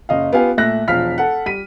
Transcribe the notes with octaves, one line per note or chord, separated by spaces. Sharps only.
F#1 D#5 F5
B3 F4 G4 F5 G#5
A#2 A3 E5 F#6 A#6
E1 F3 F5 F6 B6
A4 F#5
G3 B6 D#7